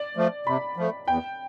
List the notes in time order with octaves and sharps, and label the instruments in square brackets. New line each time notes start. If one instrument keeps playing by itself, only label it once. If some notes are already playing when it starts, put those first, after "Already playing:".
Already playing: [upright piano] D5
[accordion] F3 A3
[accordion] C3 [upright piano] B5
[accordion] F3 A3
[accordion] E2 [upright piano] G5